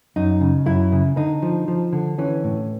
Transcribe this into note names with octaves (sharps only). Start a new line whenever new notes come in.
F#2 D#4
C#3
F#2 E4
C#3
D3 D#4
F3
F3
D3
E3 C#4
A2